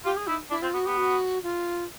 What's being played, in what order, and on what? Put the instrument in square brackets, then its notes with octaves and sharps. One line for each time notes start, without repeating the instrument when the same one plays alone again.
[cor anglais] F4 [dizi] G4
[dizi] G#4
[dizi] D#4 [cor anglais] E4
[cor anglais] D4 [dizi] E4
[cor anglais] C4 [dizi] F4
[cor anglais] B3 [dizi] F#4
[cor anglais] B3 [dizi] G4
[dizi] F#4
F4